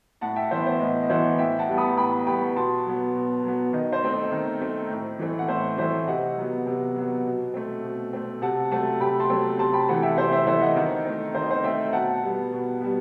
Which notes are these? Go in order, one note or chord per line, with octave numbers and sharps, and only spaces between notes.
A2 F#5 A5
E5 G5
E3 B3 C5 E5
C5
A2 D#5
D#5
E3 B3 C5 E5
A2 E5 G5
F#5 A5
G3 B3
B5 D#6
A2 G5 B5
G3 B3 G5 B5
B2 A5 C6
F#3 B3
B2
F#3 B3
D#3 D#5
C5
A3 C4
D#5
D#3
A3 C4
A2
E3 A3 C4
F#5
A2 C5 E5
E3 A3 C4 C5 E5
C3 D#5 F#5
F#3 B3
C3
F#3 B3
B2
A3 C4
B2
A3 C4
C3 F#5 A5
F#3 A3 C4 F#5 A5
C3 G5 B5
A5 C6
F#3 A3 C4
C3 A5 C6
G5 B5
E3 A3 C4 F#5 A5
E5 G5
C3 C5 E5
C5 E5
E3 A3 C4 C5 E5
D#5 F#5
D#3 D#5
A3 C4
D#3 C5
D#5
C5
A3 C4 E5 G5
B2 F#5 A5
G3 B3
B2
G3 B3